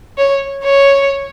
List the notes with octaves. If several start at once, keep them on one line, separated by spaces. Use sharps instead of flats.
C#5
C#5